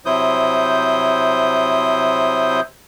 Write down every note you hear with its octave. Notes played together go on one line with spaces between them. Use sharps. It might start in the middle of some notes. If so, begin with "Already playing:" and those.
C3 F#3 E4 C5 D#6 G6